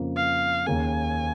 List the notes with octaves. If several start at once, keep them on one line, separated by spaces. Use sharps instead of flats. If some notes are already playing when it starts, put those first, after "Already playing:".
Already playing: F2 C#3 A#3
F5
D#2 D#3 A#3 C#4 G#4 G#5